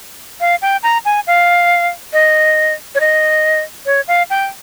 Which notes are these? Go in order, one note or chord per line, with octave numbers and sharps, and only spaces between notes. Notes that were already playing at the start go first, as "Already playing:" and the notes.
F5
G5
A#5
G#5
F5
D#5
C#5
D#5
C#5
F5
G5